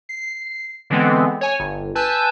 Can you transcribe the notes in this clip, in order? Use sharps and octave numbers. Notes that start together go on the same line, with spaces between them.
C7
D3 E3 G#3 B3 C4
C#5 G#5
G1
B4 G#5 A5 E6 G6